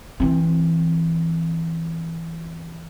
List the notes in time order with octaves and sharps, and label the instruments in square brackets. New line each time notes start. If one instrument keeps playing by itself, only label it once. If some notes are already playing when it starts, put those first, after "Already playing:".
[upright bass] E3 C4